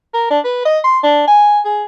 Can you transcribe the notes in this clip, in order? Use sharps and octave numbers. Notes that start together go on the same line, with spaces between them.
A#4
D4
B4
D#5
C6
D4
G#5
G#4